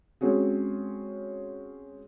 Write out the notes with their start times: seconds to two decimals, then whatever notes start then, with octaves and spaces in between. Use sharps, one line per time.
0.21 G#3 C4 C#4 F#4 G#4